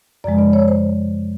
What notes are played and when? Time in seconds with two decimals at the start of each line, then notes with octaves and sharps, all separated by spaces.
0.24 F#2 C#3 F3 G#3 D5
0.39 D5
0.53 C#5
0.68 C5